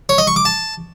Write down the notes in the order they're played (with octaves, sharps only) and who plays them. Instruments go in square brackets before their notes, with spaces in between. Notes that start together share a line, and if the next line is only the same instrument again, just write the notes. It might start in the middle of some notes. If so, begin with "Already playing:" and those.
[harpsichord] C#5
D#5
C#6
D6
A5